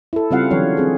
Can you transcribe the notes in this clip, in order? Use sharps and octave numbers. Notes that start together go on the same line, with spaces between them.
E4 A4
C#3 G3 C4 F4 F5 F#5
D3 E3 F#3 C#5
C4 G#4